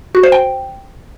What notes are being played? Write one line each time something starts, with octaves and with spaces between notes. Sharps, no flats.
F#4
C5
G5